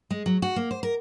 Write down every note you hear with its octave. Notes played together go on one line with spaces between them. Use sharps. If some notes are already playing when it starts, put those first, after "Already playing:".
G#3
F#3
F#4
A#3
C5
A#4